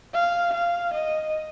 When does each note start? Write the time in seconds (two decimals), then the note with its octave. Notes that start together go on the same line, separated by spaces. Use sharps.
0.14 F5
0.54 F5
0.94 D#5